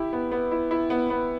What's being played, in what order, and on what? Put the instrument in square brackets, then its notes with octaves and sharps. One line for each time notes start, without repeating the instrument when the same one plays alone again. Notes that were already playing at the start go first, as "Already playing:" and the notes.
Already playing: [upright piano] E4 G4
B3
B3
E4
E4
B3
B3